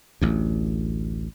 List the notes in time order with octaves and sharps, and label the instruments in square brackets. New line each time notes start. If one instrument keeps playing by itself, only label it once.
[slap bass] A1 D2